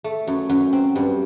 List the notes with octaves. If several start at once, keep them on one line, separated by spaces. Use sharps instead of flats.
A3
F#2
F#2
C4
G2